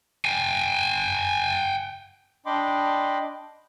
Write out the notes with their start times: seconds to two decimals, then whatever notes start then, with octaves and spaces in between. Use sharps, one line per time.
0.25 G5 G#5
2.46 D4 D#5 G5 B5 C6 D6